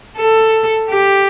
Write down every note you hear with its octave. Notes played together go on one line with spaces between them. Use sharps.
A4
G4